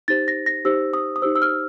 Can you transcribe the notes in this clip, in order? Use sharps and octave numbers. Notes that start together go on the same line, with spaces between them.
D#4 G4 C5 A6
A#6
A#6
D#4 G4 C5 E6
D#6
D#6
D#4 G4 C5 E6
E6
F6